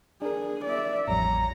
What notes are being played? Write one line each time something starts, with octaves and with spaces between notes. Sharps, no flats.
D4 G#4 A#4
D5 E5
A1 F2 G3 C#5 A#5